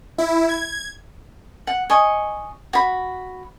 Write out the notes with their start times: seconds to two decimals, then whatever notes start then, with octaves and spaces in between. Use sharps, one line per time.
0.18 E4
0.49 G#6
1.67 F#5
1.90 D#5 G#5 C#6
2.73 F#4 B5